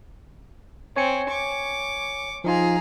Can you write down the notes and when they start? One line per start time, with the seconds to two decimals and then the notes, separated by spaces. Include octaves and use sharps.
0.96 C4 C#5 G#5 C#7
1.30 C#6 D6
2.44 F3 D#4 F4 G#4 A#5